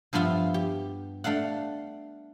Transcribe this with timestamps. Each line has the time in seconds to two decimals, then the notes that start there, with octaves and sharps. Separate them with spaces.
0.13 G2 F3 B3 F4 E5
0.54 G4
1.24 A3 D4 F5 F#5